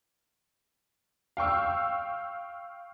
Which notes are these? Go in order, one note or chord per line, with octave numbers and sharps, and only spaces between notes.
F5 G5 C#6 E6